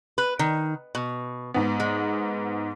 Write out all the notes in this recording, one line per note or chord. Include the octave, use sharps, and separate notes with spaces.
B4
D#3
B2
G#2 B3
G#3